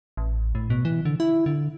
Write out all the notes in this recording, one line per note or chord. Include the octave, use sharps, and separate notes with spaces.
A1
A2
B2
E3
D3
E4
D3